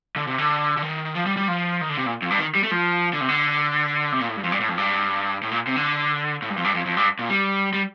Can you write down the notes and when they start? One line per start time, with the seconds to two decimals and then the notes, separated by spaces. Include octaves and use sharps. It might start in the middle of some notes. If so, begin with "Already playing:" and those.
0.16 D3
0.27 C3
0.38 D3
0.77 D3
0.82 D#3
1.15 F3
1.26 G3
1.37 G3
1.48 F3
1.81 D#3
1.89 D3
1.97 C3
2.06 A#2
2.22 F2
2.30 G2
2.38 D#3
2.55 G3
2.64 A3
2.71 F3
3.13 D3
3.21 C3
3.29 D3
4.12 C3
4.20 A#2
4.28 A2
4.36 G2
4.44 F2
4.52 G2
4.60 A2
4.69 F2
4.78 G2
5.43 A2
5.51 A#2
5.67 C3
5.76 D3
6.42 A2
6.50 G2
6.57 F2
6.64 G2
6.74 F2
6.86 F2
6.97 G2
7.19 A#2
7.29 G3
7.73 G3